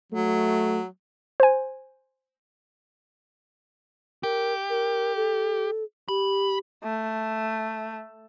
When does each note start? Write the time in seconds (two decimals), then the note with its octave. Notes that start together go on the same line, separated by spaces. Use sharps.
0.12 F#3 A3
1.40 C5 G#5
4.23 G4 A#4
4.70 A#4
5.16 A4
6.08 G4 B5
6.83 A3